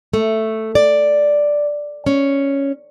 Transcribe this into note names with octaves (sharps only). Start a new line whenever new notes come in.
A3
D5
C#4